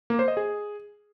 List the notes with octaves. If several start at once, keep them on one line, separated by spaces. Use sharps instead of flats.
A#3
C5
D#5
G#4